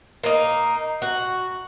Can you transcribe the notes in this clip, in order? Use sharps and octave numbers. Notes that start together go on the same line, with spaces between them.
A#3 D#4
F#4